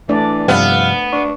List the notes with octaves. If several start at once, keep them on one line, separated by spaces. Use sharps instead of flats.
E3 A3 D4 D5
G2 C3 F3 B3 F5
D4 C#6